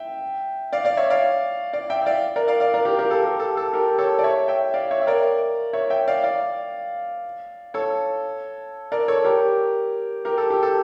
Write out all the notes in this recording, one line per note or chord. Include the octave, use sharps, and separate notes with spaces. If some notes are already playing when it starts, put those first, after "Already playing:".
Already playing: E5 G5
D5 F5
D5 F5
C#5 E5
D5 F5
D5 F5
E5 G5
E5
D5 F5
A#4 D5
D5 F5
D5 F5
A#4 D5
G4 A#4
G4 A#4
A4
G4 A#4
A4
A4
G4 A#4
A4 C#5
D5
C#5 E5
E5 G5
D5 F5
C#5 E5
E5
A#4 D5
C#5 E5
E5 G5
D5 F5
D5 F5
A4 C#5
A#4 D5
A4 C#5
G4 A#4
G4 A#4
A4
G4
A4